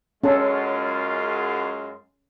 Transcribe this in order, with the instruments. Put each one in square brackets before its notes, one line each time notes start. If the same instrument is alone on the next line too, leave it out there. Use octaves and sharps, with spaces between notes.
[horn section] F#2 G#3 F4 [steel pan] C#4 A4